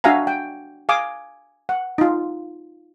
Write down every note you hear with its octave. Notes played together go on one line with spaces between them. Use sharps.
D4 F#4 E5 F5 G#5 A#5
G5
F5 G#5 D6 D#6
F#5
D#4 F4